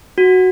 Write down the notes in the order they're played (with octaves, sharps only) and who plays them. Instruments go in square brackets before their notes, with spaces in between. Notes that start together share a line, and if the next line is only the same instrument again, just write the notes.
[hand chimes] F#4